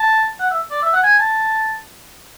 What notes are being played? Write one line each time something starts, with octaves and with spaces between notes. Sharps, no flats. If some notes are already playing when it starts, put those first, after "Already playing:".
Already playing: A5
F#5
E5
D5
E5
F#5
G#5
A5